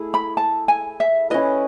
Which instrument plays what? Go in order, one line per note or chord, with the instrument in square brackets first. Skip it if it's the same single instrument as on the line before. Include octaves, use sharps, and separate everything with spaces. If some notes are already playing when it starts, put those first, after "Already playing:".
Already playing: [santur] A3 E4 G#4
[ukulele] B5
A5
G#5
E5
[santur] C#4 E4 B4 [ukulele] D#5